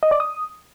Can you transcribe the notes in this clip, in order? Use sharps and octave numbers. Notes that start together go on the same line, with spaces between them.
D#5
D5
D#6